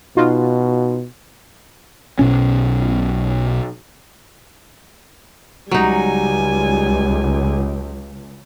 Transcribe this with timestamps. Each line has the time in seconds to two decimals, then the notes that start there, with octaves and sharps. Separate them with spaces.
0.17 B2 D#4 F4 F#4
2.19 B1 B2 C#4
5.71 C#2 F#3 G3 D#4 G#5